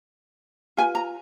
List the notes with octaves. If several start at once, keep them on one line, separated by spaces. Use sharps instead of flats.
F4 B4 G#5
A#5